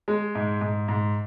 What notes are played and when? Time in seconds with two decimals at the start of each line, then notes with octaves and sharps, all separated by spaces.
0.08 G#3
0.35 G#2
0.61 G#2
0.88 G#2